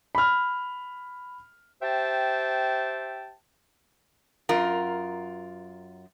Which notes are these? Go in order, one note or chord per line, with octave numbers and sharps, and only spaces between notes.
B5 F6
G4 C5 E5 G5 A5
F#2 F4 A#4